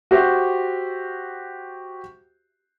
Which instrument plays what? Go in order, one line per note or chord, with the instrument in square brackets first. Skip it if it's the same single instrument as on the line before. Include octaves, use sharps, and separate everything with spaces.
[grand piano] F#4 G4 C5 E5